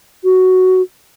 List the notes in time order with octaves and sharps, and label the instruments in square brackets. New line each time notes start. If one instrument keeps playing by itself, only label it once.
[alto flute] F#4